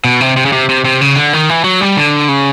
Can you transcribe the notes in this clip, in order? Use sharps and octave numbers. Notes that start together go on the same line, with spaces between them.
B2
C3
C3
C#3
C3
C3
C3
C#3
D3
D#3
E3
F#3
G3
D3
C#3